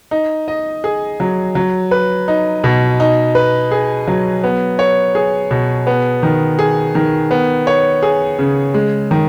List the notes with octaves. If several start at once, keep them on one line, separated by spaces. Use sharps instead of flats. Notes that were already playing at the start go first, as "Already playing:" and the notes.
D#4
D#5
G#4
F#3
F#3
B4
D#4
B2
D#4
B4
G#4
F#3
B3
C#5
G#4
B2
B3
D#3
G#4
D#3
B3
C#5
G#4
C#3
G#3
D#3